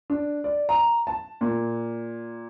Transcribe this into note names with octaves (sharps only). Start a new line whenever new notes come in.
D4
D5
A#5
A5
A#2